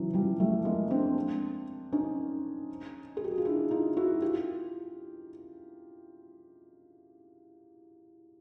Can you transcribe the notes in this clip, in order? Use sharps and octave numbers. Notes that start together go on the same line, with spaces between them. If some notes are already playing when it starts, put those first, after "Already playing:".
Already playing: C#3 E3 F#3
F3 G3
G3 A3
G#3 A#3
C4 D4
C#4 D#4
G#4
G4
F#4
F4
D4 E4
D#4 F4
E4 F#4
F4 G4